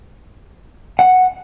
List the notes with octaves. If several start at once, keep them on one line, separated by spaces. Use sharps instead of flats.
F#5